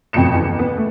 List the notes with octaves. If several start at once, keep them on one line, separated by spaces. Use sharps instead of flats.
A1 F2 B2 G5 C#7 E7
E2
B3
A3